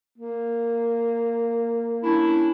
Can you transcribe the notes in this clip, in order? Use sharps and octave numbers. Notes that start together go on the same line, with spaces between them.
A#3
C#4 D4 E4